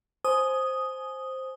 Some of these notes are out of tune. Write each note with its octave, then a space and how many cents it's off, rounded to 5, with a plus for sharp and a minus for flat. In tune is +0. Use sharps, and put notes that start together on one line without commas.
C5 +5 G#5 +25 D#6 +0